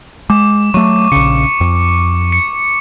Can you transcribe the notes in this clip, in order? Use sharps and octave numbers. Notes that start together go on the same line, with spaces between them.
G#3 D6
F#3 A3 C#6
A#1 C#3 C#7
F2
C#7